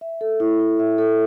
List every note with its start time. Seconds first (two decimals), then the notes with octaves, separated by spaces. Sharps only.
0.01 E5
0.21 A4
0.40 E4
0.60 E4
0.79 E5
0.98 A4